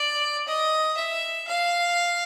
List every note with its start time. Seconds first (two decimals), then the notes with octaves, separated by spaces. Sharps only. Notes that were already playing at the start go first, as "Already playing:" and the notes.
Already playing: D5
0.48 D#5
0.97 E5
1.48 F5